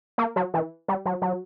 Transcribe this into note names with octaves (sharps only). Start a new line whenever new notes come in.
A#3
F#3
E3
G3
F#3
F#3